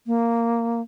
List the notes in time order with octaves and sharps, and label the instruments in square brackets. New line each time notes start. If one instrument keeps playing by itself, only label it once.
[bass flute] A#3